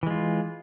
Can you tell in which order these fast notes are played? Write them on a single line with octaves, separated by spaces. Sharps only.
E3 G#3 F4